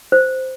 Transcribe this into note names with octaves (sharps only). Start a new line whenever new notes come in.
C5